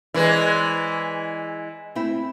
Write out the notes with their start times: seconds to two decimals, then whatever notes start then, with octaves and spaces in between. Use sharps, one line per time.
0.14 E3 G#3 B4 C5 D5
1.95 A3 C4 E4